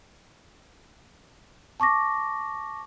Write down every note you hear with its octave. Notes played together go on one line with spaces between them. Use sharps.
A5 C#6 D6 A#6